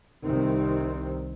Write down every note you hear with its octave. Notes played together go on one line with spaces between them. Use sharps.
C2 C3 D#3 C4